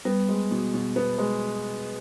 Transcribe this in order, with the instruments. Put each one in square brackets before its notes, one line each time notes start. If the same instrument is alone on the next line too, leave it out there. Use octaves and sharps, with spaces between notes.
[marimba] G3 [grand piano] B3
[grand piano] G#3
B2
B2
B3
G#3